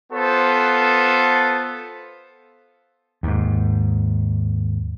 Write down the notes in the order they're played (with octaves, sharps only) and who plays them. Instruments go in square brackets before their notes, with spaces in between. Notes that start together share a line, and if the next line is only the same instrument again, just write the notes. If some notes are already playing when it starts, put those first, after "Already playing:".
[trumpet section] B3 F4 A4 C5
[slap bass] D#2 G#2